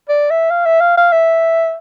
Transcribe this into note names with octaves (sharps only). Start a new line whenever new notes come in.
D5
E5
F5
E5
F5
F5
E5